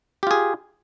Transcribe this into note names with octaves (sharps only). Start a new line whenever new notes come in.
F4 G4 G#4